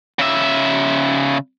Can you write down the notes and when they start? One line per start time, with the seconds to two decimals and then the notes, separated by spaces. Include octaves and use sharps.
0.19 C#3 E5